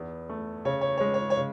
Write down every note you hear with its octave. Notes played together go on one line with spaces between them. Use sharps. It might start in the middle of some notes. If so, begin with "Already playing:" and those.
Already playing: E2 B3
A3
C#3 C#5
C#5
G#3 C#5
C#5
C#5
C#3